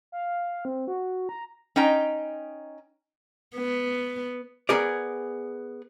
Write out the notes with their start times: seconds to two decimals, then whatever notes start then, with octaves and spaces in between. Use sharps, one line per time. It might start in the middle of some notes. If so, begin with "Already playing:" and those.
0.12 F5
0.65 C4
0.88 F#4
1.29 A#5
1.76 C#4 D#4 D#5 G5 A#5
3.56 B3
4.69 B3 G#4 A#4 D5